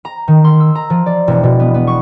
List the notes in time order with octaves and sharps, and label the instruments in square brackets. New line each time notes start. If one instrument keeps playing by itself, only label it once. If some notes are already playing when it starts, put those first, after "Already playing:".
[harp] A#5
D#3
C6
E6
A#5
F3
D5
E1
B2
B3
B3
C#6